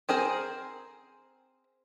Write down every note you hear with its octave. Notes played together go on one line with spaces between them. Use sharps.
C4 G#4 A#4 C5